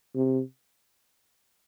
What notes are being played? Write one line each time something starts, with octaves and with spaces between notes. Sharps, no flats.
C3